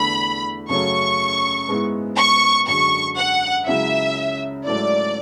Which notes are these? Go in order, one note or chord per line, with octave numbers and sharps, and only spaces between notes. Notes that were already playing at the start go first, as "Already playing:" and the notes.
Already playing: E2 D3 A3 D4 B5
F#2 C#3 F#3 A3 C#4 C#6
G#2 G#3 B3 E4
C#6
F#2 D3 G#3 C#6
F#5
C#2 C#3 F#3 C#4 E4 E5
G#2 F#3 A3 E4 D5